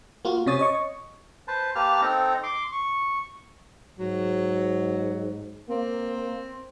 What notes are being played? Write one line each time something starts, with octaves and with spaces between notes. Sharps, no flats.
A#3 F4 F#4
C3 C#4 C#5 D#6 A6
C#5 D#5 C#6
B4 C5 A5
A#3 G4 B4 A5 F6
C4 D#4 A4 A#5
C6 D6
C#6
G#2 F#3
A#3 C4